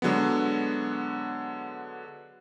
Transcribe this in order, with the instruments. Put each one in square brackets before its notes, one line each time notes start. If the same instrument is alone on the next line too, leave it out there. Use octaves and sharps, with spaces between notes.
[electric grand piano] D3 F#3 G#3 B3